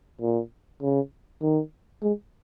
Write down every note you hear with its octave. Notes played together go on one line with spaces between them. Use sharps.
A#2
C#3
D#3
G#3